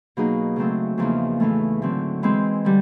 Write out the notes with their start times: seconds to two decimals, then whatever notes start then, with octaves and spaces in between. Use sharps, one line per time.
0.17 B2 F#3 A#3 D#4 G#4
0.56 C#3 F#3 A3 C4
0.98 E2 C#3 F3 A#3 D#4
1.40 A2 E3 A3
1.82 D3 F#3 A3 C4
2.23 E3 G#3 C4
2.65 D3 G3